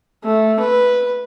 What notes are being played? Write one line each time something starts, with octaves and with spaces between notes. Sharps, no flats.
A3
B4